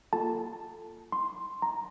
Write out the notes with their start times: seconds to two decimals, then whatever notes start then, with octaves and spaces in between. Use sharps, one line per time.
0.13 A#3 F4 A4 A5
1.12 C6
1.62 A#5